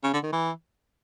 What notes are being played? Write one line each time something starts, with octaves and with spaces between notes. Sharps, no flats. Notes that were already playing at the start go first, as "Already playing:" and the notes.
C#3
D3
D#3
E3